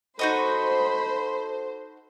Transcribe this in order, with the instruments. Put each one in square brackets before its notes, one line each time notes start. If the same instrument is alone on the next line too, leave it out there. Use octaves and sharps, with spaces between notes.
[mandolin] D#4 F#4 D#5 [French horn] A4 [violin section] C5 [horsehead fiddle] B5